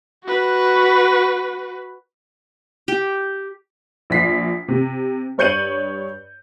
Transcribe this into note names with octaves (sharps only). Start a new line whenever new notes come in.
F#4 B4
G4
A#1 B6 C7
C3
G2 C#5 G6 C#7 D#7 F#7